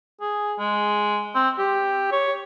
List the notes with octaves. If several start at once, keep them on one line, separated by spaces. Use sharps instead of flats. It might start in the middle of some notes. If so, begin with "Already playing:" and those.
G#4
G#3
C4
G4
C#5